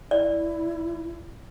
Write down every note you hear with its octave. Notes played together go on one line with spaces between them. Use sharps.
E4 D5